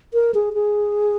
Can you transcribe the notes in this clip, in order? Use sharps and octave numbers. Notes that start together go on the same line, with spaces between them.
A#4
G#4
G#4